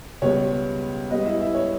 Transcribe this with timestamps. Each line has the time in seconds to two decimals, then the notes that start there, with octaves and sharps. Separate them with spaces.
0.22 C#2 B2 G3 B3 C#5
1.10 G#2 G3 B3 D#5
1.25 E4 E5
1.40 E4 E5
1.55 C#5